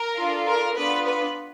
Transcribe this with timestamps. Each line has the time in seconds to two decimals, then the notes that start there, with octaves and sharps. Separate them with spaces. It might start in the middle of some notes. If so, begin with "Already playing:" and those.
Already playing: A#4
0.17 D4 F4 A4
0.46 A#4
0.76 B3 D4 F4 B4
1.05 B4